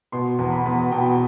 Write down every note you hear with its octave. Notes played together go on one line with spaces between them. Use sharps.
B2 C6
E2
B5
E2
B2 G5